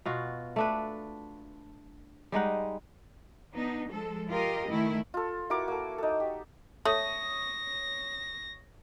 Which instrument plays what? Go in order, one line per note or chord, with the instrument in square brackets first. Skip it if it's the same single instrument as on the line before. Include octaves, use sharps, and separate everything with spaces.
[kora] B2 F4 F#4
A3 D4 B4
G3 G#3 D#4 F#5
[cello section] B3 D4 D#4
F3 G#3 A4
F4 G4 A#4 D#5
D#3 A3 E4
[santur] F4 A4
E4 F#4 A#4 D6
A#3 A4
D#4 A4
G4
[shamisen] A3 [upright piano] C#5 D#6 [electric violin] A#6